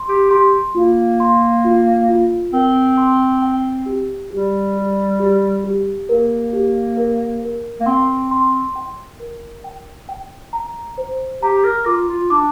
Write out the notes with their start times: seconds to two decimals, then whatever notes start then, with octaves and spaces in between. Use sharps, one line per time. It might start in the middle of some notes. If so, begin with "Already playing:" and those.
Already playing: C6
0.09 G4
0.31 G4 C6
0.75 A#3 F4
1.20 C6
1.64 F4
2.09 F4
2.53 C4 A#4
2.97 C6
3.42 G5
3.86 G4
4.31 G3 G4
4.76 G4
5.20 G4
5.64 G4
6.09 A#3 A#4
6.53 G4
6.97 A#4
7.42 A#4
7.81 A#3
7.86 C4 C6
8.31 C6
8.76 G5
9.20 A#4
9.64 G5
10.09 G5
10.53 A#5
10.98 C5
11.42 G4 A#5
11.64 A#4
11.86 F4 D6
12.09 F4
12.30 D4 D6